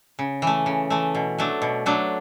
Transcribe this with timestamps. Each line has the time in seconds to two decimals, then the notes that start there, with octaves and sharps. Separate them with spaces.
0.19 C#3
0.42 E3 A3
0.66 C#3
0.90 E3 A3
1.15 B2
1.38 F#3 A3 D4
1.62 B2
1.86 F#3 A3 D4